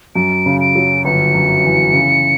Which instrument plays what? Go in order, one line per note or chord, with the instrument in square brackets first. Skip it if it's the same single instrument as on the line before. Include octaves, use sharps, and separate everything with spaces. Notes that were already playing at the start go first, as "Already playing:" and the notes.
[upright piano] F#2 [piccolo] D7
[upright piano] C#3
[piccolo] D7
[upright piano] F#3
[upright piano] G1 [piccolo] C#7
[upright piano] F#2
E3
C#3